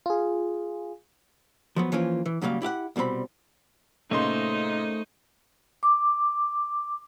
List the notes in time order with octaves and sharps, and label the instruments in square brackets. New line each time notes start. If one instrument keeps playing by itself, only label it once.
[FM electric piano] F4 G#4
[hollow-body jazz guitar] F3 F#3 B3
E3 F3 A#3 C#4 F4
E3
G#2 C#3 F#3 G3 A#3 F5
E4 G4 F5 F#5
C2 B2 G3 C4 B5
[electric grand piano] A#2 D#5 C6 [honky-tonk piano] C#3 A#3 [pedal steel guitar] A3 C5 [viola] D#4
[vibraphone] D6